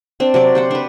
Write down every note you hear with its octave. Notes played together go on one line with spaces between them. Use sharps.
C4 D4
C3 F#3 D5
G4 C5 F#5
D4 B4